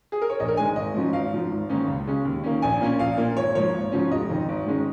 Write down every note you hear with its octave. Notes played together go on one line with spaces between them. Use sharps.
G#4
A#4
C#5
A#1 D#5
A#4
G#2 D#3 G#3 G#5
G#1 D#5
G#2 F3 C#4
G#1 F5
G#2 F3
G#1
G#2 D#3 A#3 C#4
C#2
C#3 G#3 C#4
D#2
D#3 A#3 C#4
A#1 G#5
A#2 A#3 C#4
A#1 F5
A#2 A#3
G#1 C#5
G#2 F3 A#3 C#5
G#1
G#2 F3 C#4
F1 D#5
F2 D#3
G#1
G#2 D#3 G#3 C#4